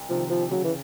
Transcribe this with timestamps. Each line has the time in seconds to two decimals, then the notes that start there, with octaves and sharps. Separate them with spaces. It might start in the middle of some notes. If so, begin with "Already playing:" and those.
Already playing: C2
0.10 C3 D#3 F3
0.30 F3
0.51 C#3 F#3
0.64 E3